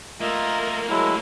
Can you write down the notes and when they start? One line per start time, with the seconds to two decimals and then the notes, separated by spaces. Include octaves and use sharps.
0.21 A3 A#3 F4 A#4 D#5 E5
0.90 F#3 G#3 E4 F#5 A5